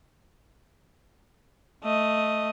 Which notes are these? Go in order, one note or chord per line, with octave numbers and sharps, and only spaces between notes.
A3 D#5